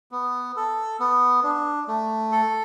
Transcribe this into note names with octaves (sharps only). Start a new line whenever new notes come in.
B3
A4
B3
D4
A3
A4